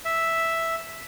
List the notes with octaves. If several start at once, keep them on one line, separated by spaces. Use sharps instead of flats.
E5